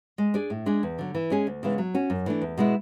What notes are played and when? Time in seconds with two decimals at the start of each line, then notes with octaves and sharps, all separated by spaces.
0.18 G#3
0.34 D4 G#4 D5
0.50 A2
0.66 G#3 D4 G#4
0.83 E2
0.99 D3 F#3
1.15 E3
1.30 G#3 C#4 G#4
1.47 D2
1.63 C#3 E3 G#3 B3
1.78 F#3
1.94 C#4 F#4
2.10 F#2
2.26 E3 A3 D4
2.42 E2
2.58 B2 G#3 B3 E4